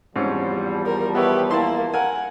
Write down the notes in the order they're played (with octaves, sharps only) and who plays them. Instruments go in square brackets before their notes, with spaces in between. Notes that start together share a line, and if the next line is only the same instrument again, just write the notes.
[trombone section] E2 F3 G3 [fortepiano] G#2 C4 C#4
[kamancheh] A#4
[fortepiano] B3 E4 C#5 [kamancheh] G4 B4
[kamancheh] A#3 E4 [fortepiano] A5 C6
[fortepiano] A#4 G#5 [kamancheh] F#5